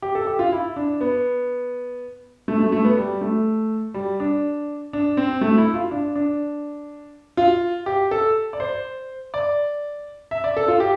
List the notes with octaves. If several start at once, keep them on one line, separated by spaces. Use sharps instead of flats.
G4
A4
G4
F4
E4
D4
B3
A3
A3
A3
B3
G3
A3
G3
D4
D4
C4
A3
E4
F4
D4
D4
F4
G4
A4
D5
C5
D5
E5
D5
A4
F4
G4